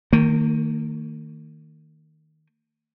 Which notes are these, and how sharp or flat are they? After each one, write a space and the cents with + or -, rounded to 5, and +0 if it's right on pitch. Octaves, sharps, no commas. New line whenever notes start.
D#3 +0 A#3 -45